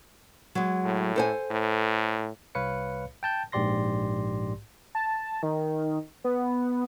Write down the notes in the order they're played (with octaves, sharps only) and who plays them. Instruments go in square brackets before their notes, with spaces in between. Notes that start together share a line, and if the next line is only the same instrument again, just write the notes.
[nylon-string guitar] F#3 G#3
[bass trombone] A2
[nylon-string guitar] A4 C5 G#5
[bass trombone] A2
[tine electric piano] C2 B4 C#5 F5 C#7
G5 A5 G6
A#1 G#2 G4 D5 C6 A#6
[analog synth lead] A5
D#3
B3